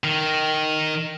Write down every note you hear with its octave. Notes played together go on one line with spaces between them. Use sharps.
D#3